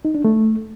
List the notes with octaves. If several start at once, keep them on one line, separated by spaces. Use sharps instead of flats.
D#4
D4
A3